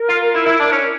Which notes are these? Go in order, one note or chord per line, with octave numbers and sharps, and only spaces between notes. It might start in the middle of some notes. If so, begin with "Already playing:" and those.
Already playing: A#4
F4
E4
E4
D4
C#4